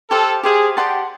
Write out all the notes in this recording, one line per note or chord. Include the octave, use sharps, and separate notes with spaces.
G4 A4 C5 F5
G4 G#4 C5 F5
G4 D5 F#5 A5 C6